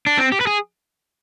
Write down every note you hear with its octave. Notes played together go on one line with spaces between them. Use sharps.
D4
C4
G4
B4
G#4